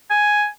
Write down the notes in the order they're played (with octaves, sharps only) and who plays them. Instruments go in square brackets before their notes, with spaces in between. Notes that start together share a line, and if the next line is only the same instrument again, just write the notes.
[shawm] G#5